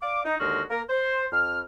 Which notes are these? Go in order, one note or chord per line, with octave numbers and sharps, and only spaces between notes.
D5 F5 D6
D#4
D#2 D3 G#3 F#4 F6
A#3 A#4
C5
F2 F6